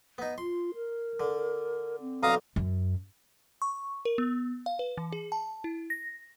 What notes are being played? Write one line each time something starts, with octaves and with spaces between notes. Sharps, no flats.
B3 D#4
F4 C6
A#4
D3
C4
B1 D3 F5 A#5 D#6
F#2
C#6
A#4
B3
F5
B4
E3
G#4
A5
E4
A#6